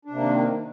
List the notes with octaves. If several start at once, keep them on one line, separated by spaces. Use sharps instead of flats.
C3 D#3 A#3 D4